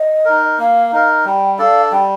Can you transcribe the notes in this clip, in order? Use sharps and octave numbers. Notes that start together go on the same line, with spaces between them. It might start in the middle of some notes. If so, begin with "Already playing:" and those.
Already playing: D#5
D#4 A#4
A#3 F5
D#4 A#4
G3 G5
D4 A4 D5 F5
G3 G5